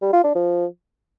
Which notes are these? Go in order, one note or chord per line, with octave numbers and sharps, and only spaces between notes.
G3
F4
D4
F3